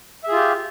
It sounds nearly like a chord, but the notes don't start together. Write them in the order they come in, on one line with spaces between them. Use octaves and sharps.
E5 G#4 F4 G4